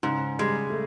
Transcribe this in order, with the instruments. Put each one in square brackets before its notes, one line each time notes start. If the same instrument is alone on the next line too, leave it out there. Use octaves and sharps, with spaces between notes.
[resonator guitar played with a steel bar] G#2 [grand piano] C#3
[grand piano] G3 [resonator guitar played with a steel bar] G#3
[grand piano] A3